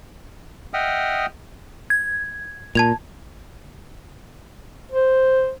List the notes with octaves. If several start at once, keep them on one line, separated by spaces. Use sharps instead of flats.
D#5 E5 F#5 G5 D#6 F6
G#6
A#2 A5 G#6 F7
C5